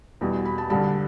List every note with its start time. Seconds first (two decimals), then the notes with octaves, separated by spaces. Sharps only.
0.21 E2 B2 G3
0.45 B5
0.58 A5
0.70 G2 D3 G3 A5